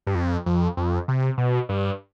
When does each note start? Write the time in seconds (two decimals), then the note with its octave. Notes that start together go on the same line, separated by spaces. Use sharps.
0.07 G2
0.15 F2
0.46 F2
0.77 F2
1.08 C3
1.38 B2
1.69 G2